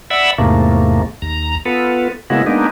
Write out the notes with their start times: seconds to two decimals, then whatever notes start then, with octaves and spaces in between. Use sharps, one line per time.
0.10 D5 E5 F#5 B5 E6
0.38 E2 G#2 C3 A3 A#3
1.22 D#2 A#5
1.66 B3 F4 A4 B4
2.30 C#3 G#3 A#3 B3 E4 F#4
2.46 G#3 A#3 B3 D4 D#4